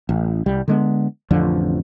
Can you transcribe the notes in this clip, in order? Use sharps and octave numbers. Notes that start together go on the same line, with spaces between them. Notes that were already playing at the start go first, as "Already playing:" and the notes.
A1
C2 G3
D3 G#3 B3
A1 F2 D3 F3